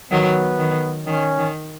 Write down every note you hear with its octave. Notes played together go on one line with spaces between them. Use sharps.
D#3 F#3 B3
D#3
D#3 C#4
D#3